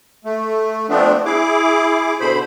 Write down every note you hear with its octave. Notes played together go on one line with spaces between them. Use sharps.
A3
F3 A3 B3 C4 D4
E4 G#4 D6
B2 D3 C5 B5